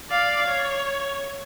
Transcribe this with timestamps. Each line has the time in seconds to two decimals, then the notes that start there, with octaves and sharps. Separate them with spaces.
0.10 D5 F5
0.48 C#5